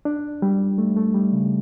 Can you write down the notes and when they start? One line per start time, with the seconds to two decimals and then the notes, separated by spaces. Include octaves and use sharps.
0.05 D4
0.42 G3
0.78 A3
0.97 A3
1.14 G3
1.33 C#3